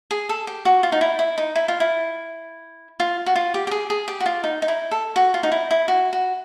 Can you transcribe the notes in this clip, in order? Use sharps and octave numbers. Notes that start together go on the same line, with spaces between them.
G#4
A4
G4
F#4
F4
D#4
E4
E4
D#4
E4
F4
E4
F4
F#4
F4
G4
G4
G#4
G#4
G4
F#4
F4
D#4
D#4
E4
A4
F#4
F4
D#4
E4
E4
F#4
F#4